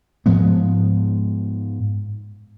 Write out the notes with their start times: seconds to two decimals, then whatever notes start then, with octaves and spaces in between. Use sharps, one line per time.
0.26 G#2 F3 G#3 B3